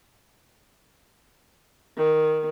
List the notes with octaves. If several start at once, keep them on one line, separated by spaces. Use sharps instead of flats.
D#3